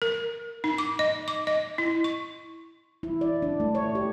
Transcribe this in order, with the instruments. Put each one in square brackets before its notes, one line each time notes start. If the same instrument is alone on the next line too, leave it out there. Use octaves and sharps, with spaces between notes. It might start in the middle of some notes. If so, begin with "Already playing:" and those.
[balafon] A#4
D#4
D6
D#5
D6
D#5
E4
C#6
[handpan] E4
D5
D4
A3
C#5
G4